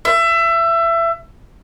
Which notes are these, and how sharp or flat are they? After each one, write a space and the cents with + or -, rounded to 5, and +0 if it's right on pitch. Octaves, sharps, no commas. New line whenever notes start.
E5 +25